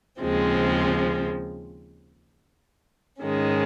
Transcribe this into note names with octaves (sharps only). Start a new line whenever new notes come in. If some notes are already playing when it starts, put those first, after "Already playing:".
D#2 C#3 F3 G#3 C4
G#2 D#3 G#3 C#4